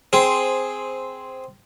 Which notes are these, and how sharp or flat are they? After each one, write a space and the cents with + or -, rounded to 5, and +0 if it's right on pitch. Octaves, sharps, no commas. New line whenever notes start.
C4 -5 G#4 +0 C5 +0